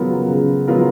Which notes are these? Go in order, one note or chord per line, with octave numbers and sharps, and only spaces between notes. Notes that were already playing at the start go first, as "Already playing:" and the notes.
Already playing: C#3 F#3 B3 F4 A#4
C#3
F#3 B3 F4 A#4